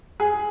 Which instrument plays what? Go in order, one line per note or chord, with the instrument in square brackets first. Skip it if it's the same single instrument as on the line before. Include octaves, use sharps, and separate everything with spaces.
[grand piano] G#4